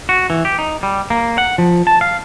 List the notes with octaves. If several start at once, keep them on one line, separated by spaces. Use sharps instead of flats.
F#4
E3
G4
D#4
G3
A#3
F#5
F3
A5
F5